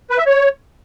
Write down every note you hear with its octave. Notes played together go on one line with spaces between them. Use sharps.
B4
E5
C#5